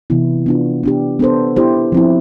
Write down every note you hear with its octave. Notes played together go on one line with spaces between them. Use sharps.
C3 E3 B3 E4
B3 D4 F4
B3 D4 G4
B3 D4 A4 C5
B3 E4 G4 C5
F3 C4 E4